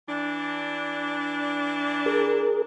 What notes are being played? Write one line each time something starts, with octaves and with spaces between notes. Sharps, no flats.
E3 D4
G#4 A#4